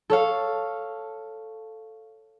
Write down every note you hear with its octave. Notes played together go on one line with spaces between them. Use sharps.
A4 C#5 F5